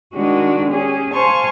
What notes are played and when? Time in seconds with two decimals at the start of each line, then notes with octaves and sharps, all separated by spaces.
0.14 D#3 G#3 D4 D#4 F#4
0.69 C#4 G4 G#4
1.13 C5 F5 G#5 A5 C6 C#6